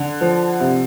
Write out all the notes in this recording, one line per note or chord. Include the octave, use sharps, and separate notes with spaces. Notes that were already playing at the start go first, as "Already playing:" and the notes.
Already playing: D3
F3
C3